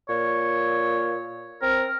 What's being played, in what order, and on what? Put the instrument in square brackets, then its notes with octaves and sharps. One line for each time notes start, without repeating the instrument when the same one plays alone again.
[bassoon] A#2 [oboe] C#5
[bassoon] C4 [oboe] A#4